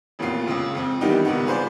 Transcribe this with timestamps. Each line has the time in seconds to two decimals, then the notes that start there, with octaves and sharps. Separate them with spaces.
0.19 A1 F2 A#2 B3 F4 C7
0.47 C#2 C#3
0.75 F2 C4
1.01 D#3 E3 G3 B3 D#4 G4
1.25 C#2 G#2 D#3 G3 B3
1.46 F4 G#4 B4 C5 D5